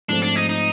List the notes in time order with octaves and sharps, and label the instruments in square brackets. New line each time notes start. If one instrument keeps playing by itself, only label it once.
[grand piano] G#2 F3 A3 C4 [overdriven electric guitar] D4
[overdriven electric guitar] D4
D#4
D#4